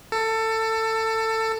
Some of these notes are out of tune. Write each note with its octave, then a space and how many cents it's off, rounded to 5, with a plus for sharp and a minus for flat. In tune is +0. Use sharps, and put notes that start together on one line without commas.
A4 +20